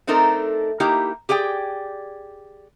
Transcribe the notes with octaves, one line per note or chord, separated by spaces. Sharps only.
A3 C4 D4 D#4 A4 A#4
A#3 D#4 E4 G4
G4 G#4 D5 G5